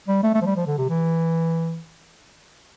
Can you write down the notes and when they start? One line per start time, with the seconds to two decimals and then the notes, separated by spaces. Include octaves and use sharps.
0.08 G3
0.23 A3
0.34 A3
0.42 F3
0.46 G3
0.56 F3
0.67 D3
0.78 C3
0.89 E3